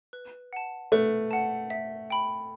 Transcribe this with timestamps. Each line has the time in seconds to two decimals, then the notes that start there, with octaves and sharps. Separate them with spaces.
0.13 B4
0.53 F#5 A5
0.92 A3 B4
1.31 F#5 A5
1.70 E5
2.10 G5 B5